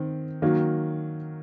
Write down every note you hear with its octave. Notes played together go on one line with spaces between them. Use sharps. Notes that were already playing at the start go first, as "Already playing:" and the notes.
Already playing: D#3 C4
D#3 F#3 A#3